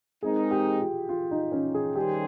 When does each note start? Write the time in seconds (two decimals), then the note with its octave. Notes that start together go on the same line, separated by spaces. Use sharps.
0.22 G#3 C4 D#4 G#4 A#4
0.51 G4
0.80 F4
1.09 F4
1.31 D#4
1.52 C#4
1.74 G#4
1.95 D#3 G3 C#4 G4 G#4 C5